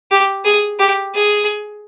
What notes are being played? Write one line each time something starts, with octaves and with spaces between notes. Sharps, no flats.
G4
G#4
G4
G#4